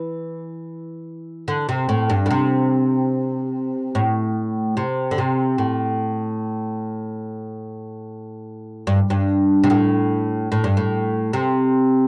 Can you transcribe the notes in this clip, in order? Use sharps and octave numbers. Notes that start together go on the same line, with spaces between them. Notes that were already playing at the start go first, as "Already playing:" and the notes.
Already playing: E3
D3
C3
A2
G2
A2
C3
A2
C3
D3
C3
A2
G2
G2
C3
A2
A2
G2
A2
C3